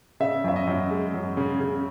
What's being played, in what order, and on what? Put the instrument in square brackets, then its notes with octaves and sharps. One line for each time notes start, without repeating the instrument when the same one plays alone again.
[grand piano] C#3 E5
F#2 E5
D#5
F#2
G#3
F#2
C#3
C#3